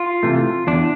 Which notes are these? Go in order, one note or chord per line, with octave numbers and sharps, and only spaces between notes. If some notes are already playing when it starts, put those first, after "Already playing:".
Already playing: F4
C3 E3 A3
E2 D4